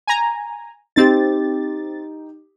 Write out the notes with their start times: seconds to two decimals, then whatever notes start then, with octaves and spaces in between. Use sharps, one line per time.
0.07 G#5 A#5
0.96 C4 D#4 G4 A6